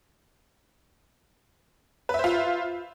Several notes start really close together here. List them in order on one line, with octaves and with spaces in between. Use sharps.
B4 E5 C5 F4